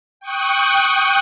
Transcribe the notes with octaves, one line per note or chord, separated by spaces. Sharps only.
G5 C#6 D#6 F#6